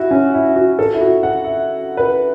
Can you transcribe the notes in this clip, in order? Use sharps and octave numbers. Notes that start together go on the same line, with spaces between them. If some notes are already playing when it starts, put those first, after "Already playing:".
Already playing: E4 F#4
C#4
E4
F#4
A4
E4
F#4
F#5
E5
B4